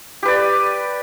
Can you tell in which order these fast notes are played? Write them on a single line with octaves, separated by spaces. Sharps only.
G4 B4 D5